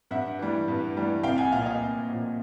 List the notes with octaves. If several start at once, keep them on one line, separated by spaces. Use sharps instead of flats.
G2 E5 F#5
E3 G3
G2
E3 G3
C2 F5 G5
F#5 G#5
A#2 F3 F5 G5
D#5 F5
C2
A#2 F3